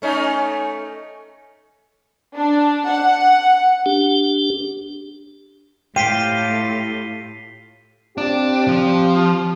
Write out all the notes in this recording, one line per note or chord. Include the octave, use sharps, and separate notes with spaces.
A3 C#4 D#4
D4
F#5
D4 G4
A2 F4 G4 G5 B6 C7 D#7
C4 D4 F4 G4
F3